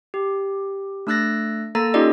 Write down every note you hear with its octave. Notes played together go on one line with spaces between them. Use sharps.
G4
A3 D4 E6 F#6 A6 A#6
A#3 A4 A#5 E6 A6
C#4 D#4 F4 G4 D5 D#5